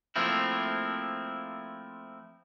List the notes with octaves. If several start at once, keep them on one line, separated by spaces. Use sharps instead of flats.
F3 A3 A#3 C4 E4